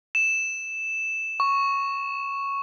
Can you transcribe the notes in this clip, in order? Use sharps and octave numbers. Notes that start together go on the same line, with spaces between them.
E7
C#6